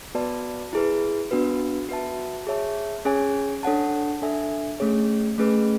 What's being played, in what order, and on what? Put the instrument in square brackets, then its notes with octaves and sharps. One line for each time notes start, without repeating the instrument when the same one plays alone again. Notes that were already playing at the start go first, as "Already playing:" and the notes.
[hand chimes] B3 F#4 B4 D5 A5
E4 G#4 B4
B3 D4 F#4 B4
F#4 B4 E5 A5
G#4 C#5 E5 A5
C#4 G#4 C#5 G#5
D4 A4 C#5 F#5 A5
D4 A4 E5 G#5
A3 C#4 G#4 C#5
A3 C#4 G#4 B4